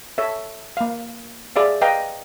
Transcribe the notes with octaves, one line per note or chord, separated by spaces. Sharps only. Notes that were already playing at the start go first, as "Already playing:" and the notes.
A4 C#5 E5
A#3 F5
G#4 D5 E5 F5
B4 D#5 F5 G5 A#5